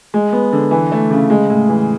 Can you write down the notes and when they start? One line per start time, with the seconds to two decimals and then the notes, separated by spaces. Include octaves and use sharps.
0.14 G#3
0.33 B3
0.52 D3
0.71 E3
0.92 A3
1.11 C#3
1.30 G#3
1.50 A2
1.69 E3